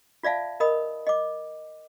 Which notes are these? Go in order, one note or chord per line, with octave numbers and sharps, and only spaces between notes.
F4 D5 E5 F5 A5
A#4 D#5 B5 D#6
D#5 D6